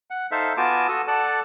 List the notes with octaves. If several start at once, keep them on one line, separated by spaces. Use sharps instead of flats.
F#5
D#4 A4 C5 E5 F5
B3 F4 F#4 G#5 A5 D6
F#4 A4 D#6 E6
A4 D5 F#5 A5